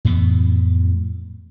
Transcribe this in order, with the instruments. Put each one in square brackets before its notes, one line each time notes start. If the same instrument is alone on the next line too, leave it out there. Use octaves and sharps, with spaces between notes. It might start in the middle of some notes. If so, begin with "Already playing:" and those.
[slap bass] F2 A2 E3 B3